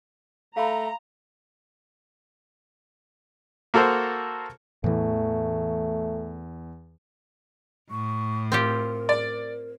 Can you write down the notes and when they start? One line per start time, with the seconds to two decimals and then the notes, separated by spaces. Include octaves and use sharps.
0.57 A3 F5 A#5 B5
3.74 A#3 F#4 A4 A#4 C5
4.84 E2 A2 E3 A3
7.91 A2 C#6
8.52 C4 F4 G4 A#4
9.09 D5